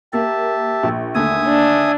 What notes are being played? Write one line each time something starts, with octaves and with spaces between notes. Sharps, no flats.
A#3 G4 E5 A5
A#1
D#2 D3 A3 E5 G#5 D#6
D4